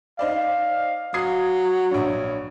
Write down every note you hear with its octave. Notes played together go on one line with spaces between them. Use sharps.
D#4 C5 D5 F5
F#3 D#6 G#6 C7
A#1 G2 C#5